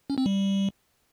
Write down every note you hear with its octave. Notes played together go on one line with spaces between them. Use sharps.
C#4
C4
G3